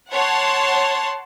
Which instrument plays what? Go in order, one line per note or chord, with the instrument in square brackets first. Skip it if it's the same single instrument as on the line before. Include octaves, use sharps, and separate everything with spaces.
[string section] C#5 F#5 A5 C6